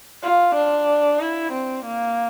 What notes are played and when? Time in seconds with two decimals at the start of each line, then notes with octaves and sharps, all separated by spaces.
0.22 F4
0.55 D4
1.20 E4
1.52 C4
1.85 A#3